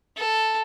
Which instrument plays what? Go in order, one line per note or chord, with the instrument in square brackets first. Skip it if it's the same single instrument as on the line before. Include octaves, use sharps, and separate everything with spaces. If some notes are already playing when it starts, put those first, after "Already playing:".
[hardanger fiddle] A4